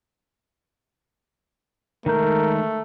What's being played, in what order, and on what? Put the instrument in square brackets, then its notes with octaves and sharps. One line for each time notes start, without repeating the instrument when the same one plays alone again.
[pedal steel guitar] D#3 G#3 G6 [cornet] A3 [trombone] A#4